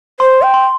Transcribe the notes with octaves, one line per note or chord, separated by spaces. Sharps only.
C5 C6
G5
C6